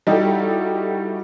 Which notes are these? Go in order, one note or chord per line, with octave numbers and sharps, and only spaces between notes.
G3 D#4 E4 F#4 G4 A4